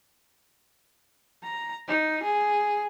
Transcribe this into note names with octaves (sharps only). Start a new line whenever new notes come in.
A#5
D#4
G#4